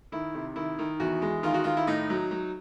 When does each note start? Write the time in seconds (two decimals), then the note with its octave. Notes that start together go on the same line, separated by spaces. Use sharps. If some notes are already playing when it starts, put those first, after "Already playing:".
0.12 D#3 E4
0.35 C3
0.56 D#3 E4
0.79 D#3
1.00 E2 F#4
1.22 G#3
1.43 D#3 F4
1.54 F#4
1.64 D#3 F4
1.77 E4
1.87 A2 D#4
2.10 F#3
2.31 F#3